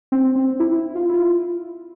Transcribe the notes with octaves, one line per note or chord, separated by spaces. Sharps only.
C4
C4
E4
E4
F4
E4
F4